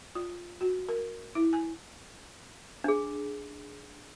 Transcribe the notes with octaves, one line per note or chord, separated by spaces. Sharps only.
F4
F#4
A#4
E4
G#5
D4 G#4